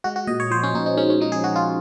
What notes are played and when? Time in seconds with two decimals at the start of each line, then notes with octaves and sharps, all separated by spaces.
0.04 G#3 F#4
0.16 F#4
0.27 A#2 D#5
0.40 C#5
0.51 F3 C5
0.63 C#4
0.74 A#2 D#4
0.86 D#4
0.97 G#3 C#4
1.10 C#4
1.21 F3 D#4
1.32 G#4
1.43 F3 F#4
1.56 F4